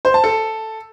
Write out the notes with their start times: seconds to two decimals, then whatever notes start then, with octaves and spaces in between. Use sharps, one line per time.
0.05 C5
0.14 A5
0.24 A4